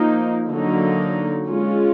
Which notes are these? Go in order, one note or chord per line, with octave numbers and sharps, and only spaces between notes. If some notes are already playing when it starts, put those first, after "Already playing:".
Already playing: F3 A#3 D#4
D3 F#3 A#3 D#4
G#3 C#4 F4